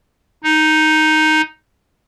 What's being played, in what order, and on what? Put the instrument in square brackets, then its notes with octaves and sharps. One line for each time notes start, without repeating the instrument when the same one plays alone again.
[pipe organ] D#4